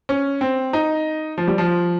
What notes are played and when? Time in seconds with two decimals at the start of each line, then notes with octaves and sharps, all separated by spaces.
0.09 C#4
0.41 C4
0.73 D#4
1.38 F3
1.48 G3
1.58 F3